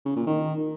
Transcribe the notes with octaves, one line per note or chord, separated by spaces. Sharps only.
C#3
A#2
D#3